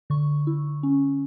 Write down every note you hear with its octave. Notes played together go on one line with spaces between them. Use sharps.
D3 C#6
E4
C#4